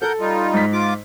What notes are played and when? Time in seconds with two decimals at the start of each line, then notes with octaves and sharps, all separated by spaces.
0.02 A4 A#4 F#5 G6
0.20 G3 D#4 F4
0.53 G#2 B6
0.73 F4 D6